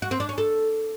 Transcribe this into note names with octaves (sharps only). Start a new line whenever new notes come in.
F#4
C4
D4
C#4
A4